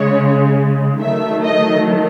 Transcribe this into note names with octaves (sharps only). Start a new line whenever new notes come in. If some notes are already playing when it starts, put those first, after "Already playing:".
Already playing: C#3 G#3 C#5
D#3 F#3 A3 E5
D#5